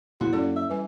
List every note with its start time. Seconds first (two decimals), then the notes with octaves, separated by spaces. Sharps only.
0.21 A#2 C#3 F3 E4 F#4
0.33 F#2 A#3 C#4 A4 D5
0.56 E5
0.69 E3 G3 G#5